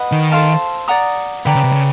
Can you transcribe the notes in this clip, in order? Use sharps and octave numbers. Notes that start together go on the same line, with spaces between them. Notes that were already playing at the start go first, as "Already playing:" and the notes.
Already playing: B4 D#5 F#5
D#3
A4 C5 F5 A5
D5 F#5 A#5 D#6
D3 B4 D5 G5 A#5
C#3
C3
C#3